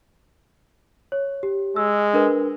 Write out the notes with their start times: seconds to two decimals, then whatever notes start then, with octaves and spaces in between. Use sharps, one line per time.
1.12 C#5
1.43 G4
1.76 G#3 E6
2.14 D4 A#4 B4